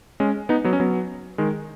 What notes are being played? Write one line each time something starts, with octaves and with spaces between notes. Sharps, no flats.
G#3 C#4
B3 D#4
F#3 B3
C#4
F#3 B3
D#3 G#3